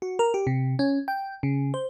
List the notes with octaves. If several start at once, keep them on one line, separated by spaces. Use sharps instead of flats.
F#4
A#4
G4
C3
C#4
G5
C#3
C5